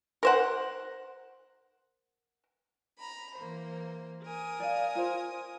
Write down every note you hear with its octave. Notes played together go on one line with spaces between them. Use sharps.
A#4 C5 F#5
A#5 B5
E3 A#3 C5
A#4 G#5 D#6
D5 F5
F4 C5